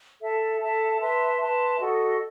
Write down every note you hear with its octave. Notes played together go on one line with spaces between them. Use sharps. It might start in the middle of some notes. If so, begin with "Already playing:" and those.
A4 E5 A5
A4 E5 A5
B4 E5 A5 C6
B4 E5 A5 C6
F#4 A4 D#5